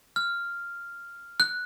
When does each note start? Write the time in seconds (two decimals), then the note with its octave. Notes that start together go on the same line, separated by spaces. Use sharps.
0.16 F6
1.40 F#6